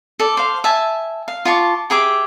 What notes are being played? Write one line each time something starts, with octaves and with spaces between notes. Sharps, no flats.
A4 D5
C5 F5
E5 G#5 A5
F5
F4 A5 C#6 D6
G4 G#4 E5 D6